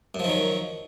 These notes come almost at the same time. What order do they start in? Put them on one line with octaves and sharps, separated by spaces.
F#2 F3 D#3 F#3